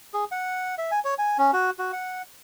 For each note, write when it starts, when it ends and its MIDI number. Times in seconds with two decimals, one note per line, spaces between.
0.14 0.25 68
0.32 0.75 78
0.78 0.91 76
0.91 1.00 80
1.05 1.14 73
1.19 1.37 80
1.38 1.51 61
1.53 1.70 66
1.79 1.92 66
1.93 2.22 78